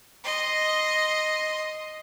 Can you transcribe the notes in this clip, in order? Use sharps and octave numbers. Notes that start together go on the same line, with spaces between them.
D#5 C6